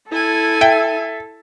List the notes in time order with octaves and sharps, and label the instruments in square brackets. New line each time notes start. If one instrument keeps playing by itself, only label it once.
[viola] E4 G#5 [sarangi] A4
[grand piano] E5 [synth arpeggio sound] G5